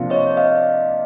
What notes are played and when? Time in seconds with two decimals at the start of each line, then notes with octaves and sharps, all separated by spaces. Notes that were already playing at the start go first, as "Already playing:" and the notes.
Already playing: C3 F3 A#3 D4 F4
0.10 C#5 D#5
0.37 D#5 F5